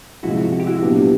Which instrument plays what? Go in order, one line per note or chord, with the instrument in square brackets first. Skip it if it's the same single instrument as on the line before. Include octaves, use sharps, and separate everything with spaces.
[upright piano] C3 F3 G#3 [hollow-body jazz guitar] E4 F#4
[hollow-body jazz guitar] F#4
G4
E4 F#4
[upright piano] A#2 F#3 B3 D4 G4